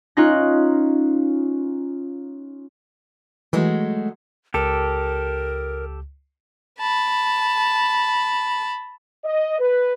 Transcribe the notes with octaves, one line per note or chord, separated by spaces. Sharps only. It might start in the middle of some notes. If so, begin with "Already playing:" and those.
C#4 D#4 F4 F#6 A#6
E3 F#3 G#3 A3
C#2 G4 A4 A#4
A5 B5
D#5
B4